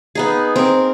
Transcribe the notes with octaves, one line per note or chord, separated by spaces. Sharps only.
B3 D#4 G#4
C4 A#4